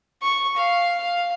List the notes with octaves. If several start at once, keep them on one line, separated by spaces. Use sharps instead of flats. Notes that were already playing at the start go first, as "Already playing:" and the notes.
C#6
F5
F5